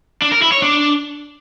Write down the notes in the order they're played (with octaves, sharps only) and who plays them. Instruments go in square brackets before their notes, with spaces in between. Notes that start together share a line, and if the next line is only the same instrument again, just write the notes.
[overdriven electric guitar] D4
A#4
E4
C#5
D4